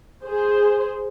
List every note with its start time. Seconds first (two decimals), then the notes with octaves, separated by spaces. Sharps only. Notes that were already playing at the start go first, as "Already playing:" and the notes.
0.24 G#4 C5